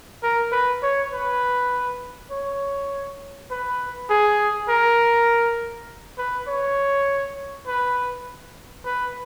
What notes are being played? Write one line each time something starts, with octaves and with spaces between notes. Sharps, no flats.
A#4
B4
C#5
B4
C#5
B4
G#4
A#4
B4
C#5
B4
B4